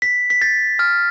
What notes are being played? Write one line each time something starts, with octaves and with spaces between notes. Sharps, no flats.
B6
B6
A6
F6